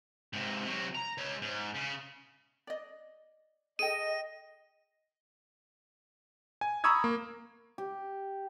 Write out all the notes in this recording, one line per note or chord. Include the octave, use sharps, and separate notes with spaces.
G#2 C3
C3 F#3
A#5
G#3 C#5
G#2
C#3
D5 D#5
G#4 A4 D#5 G5 D#7
G#5
A#5 B5 C#6 D#6 E6 G#6
A#3
G4